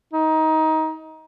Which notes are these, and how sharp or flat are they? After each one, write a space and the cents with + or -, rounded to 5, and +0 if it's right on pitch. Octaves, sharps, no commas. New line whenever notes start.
D#4 +20